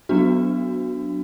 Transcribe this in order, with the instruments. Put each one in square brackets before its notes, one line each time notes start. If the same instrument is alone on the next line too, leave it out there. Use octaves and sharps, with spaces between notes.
[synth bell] F#3 B3 D4 F#4